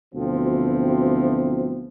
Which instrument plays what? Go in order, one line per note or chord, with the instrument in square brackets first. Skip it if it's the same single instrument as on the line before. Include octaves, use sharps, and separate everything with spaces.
[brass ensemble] D2 B2 E3 F3 C4